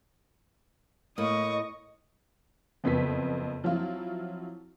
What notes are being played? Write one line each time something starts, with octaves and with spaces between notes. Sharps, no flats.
A2 A#3 D#5 C#6 D#6
F#1 F2 B3 B6
F3 F#3 C4 E4 F4